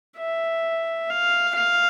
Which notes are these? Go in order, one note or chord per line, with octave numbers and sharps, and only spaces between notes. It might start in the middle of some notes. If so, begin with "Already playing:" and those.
E5
F5
F5